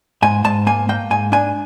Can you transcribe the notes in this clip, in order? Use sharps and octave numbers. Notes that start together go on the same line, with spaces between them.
G#2 G#5
G#2 A5
A#3 G#5
A#3 G5
G#2 G#5
D4 G#5